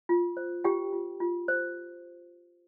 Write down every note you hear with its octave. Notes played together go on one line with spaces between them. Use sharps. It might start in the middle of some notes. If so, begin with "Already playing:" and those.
F4
C5
F4 G4 G5
F4
F4
C5